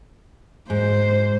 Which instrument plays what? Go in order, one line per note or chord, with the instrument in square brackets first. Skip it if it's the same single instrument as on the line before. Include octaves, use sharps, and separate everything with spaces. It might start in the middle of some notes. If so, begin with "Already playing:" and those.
[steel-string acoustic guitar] G#2 [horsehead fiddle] C5